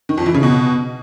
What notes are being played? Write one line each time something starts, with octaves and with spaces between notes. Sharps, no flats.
D#3
F2
E3
C#3
B2